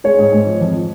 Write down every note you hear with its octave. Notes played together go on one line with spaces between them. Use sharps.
G#3 G#4 C#5
G#2
G#2
F3
F2